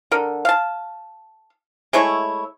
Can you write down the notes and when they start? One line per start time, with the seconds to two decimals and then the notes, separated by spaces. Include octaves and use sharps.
0.11 D3 A#4
0.45 F5 A5
1.93 G#3 A3 E4 C#5